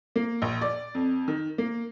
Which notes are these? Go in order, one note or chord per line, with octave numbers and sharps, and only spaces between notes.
A#3
A#1
D5
F2
D#3
A#3